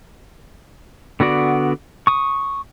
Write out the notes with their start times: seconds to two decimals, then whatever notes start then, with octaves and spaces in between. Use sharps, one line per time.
1.20 D3 B3 F#4 D5
2.07 C#6 D#6